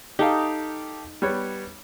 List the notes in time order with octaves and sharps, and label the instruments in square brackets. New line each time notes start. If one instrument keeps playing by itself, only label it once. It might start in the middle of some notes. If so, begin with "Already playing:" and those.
[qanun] D#4 [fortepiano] G4 A4 F5
[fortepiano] G3 B3 C#5